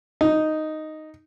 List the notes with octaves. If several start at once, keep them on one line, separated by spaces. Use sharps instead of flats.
D#4